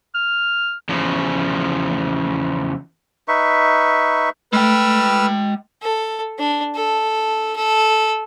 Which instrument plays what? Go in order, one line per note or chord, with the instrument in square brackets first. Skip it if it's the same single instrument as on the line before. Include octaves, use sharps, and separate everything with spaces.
[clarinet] F6
[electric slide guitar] E2 C#3 F3
[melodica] D#4 B4 E5 C#6
[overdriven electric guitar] G#3 G5 [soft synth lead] A3 [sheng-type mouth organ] B4 E6 F6
[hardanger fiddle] A4
D4
A4
A4